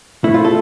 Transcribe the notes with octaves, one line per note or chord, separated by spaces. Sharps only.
A3 E4
F4
A4